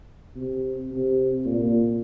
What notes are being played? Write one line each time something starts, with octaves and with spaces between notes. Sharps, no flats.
C3
C3
A#2